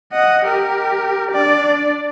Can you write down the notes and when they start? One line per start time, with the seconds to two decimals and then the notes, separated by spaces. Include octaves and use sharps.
0.13 D#5 F#5
0.45 G4 A#4
1.31 D4 D5